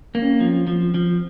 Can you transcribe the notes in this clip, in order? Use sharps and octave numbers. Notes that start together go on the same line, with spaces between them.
A#3 C4
C#4
C4
F3
F3
F3